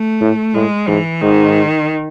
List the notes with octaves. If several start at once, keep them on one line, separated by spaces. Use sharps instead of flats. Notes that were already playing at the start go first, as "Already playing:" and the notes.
Already playing: A3
A2
A2 G#3
G#2 E3
G#2 D#3